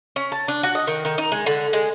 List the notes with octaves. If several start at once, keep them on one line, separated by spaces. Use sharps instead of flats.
C#4
A5
D4
F#4
D#5
D#3
D#3
D#4
G#3
D3
G#3